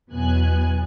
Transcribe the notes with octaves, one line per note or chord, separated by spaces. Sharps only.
E2 B2 F#3 B3 G#5 F#6